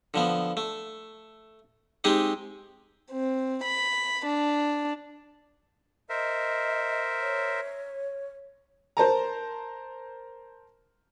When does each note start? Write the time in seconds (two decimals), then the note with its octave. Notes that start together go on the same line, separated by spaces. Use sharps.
0.14 D3 F3 B3
0.57 A3
2.04 G#3 C4 D#4 G4 G#4
3.11 C4
3.63 B5
4.25 D4
6.10 A#4 C5 D#5 E5
7.20 C#5
8.97 A#4 C5 A5 A#5